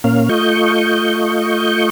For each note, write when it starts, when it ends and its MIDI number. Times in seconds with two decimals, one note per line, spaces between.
0.04 0.29 46
0.04 0.29 58
0.04 0.29 61
0.04 0.29 77
0.29 1.90 57
0.29 1.90 65
0.29 1.90 75
0.29 1.90 85
0.29 1.90 91